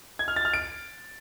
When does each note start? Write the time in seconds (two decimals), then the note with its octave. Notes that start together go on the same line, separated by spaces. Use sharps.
0.19 G#6
0.28 F6
0.36 A6
0.45 F6
0.54 D7